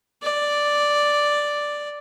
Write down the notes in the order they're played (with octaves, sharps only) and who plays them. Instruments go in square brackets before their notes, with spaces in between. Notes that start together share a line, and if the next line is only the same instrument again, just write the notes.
[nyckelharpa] D5